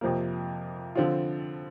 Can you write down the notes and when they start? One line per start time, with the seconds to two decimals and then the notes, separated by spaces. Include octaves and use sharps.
0.01 F2 C3 F3 A#3
0.95 D3 F3 C4 F4